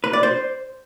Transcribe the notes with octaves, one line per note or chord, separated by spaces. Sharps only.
B4
D5
C5